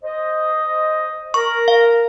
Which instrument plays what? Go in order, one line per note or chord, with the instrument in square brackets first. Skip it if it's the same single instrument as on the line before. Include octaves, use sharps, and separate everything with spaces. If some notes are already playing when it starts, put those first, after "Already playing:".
[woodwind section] C5 D#5
[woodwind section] A#4 [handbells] C#6
[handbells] F5